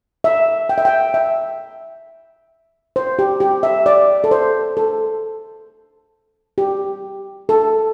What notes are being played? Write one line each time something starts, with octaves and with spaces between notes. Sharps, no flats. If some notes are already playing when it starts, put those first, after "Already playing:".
E5
G5
E5
G5
E5
C5
G4
G4
E5
D5
A4
C5
A4
G4
A4